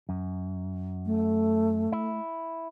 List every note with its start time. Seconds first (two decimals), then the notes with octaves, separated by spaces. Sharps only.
0.09 F#2
1.06 A3
1.92 E4